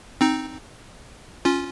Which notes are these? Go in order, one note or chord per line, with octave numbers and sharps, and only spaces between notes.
C4 D#4
C#4 F4